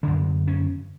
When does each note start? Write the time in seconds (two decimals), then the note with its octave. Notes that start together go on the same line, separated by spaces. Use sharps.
0.03 F#2 D3 D4
0.48 C#4